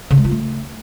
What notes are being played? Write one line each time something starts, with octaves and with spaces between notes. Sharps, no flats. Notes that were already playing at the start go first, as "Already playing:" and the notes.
C#3
G#3
F4
A3